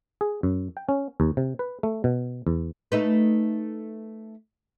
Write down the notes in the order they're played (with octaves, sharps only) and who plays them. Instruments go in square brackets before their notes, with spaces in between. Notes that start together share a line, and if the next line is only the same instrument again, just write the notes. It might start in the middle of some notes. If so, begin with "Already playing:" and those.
[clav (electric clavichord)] G#4
F#2
G5
C#4
D#2
C3
B4
A3
B2
E2
[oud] A3 D#4 B4